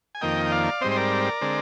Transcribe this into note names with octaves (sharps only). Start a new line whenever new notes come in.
G#5
F2 D#3 A#3 D#5 G5
G5
D5 F5
G#2 G3 C4 C5 D#5
C5
A#4 D5
D3 G#3 C4